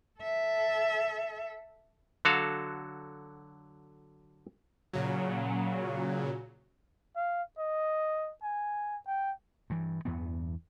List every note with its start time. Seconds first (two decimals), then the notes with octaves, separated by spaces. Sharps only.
0.20 A4 E5
2.25 D3 F#3 F#4 A4 F5
4.93 A#2 C#3 F#3
7.16 F5
7.59 D#5
8.43 G#5
9.07 G5
9.70 G2 E3
10.05 E2 G2 E3 B3